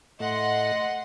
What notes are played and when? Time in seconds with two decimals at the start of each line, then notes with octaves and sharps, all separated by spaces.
0.20 A2 A3 D#5 F#5 C6